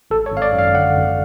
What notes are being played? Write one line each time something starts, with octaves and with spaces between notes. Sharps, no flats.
G#1 A4
C#5
G#1 F5
D5
F#2
F5
D3 F#5
G#1